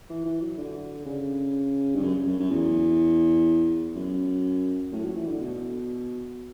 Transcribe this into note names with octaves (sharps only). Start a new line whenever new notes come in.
E3
E3
F#3
D3
C#3
G2
F#2
F#2
F#2
E2
F#2
A2
F#3
E3
D3
B2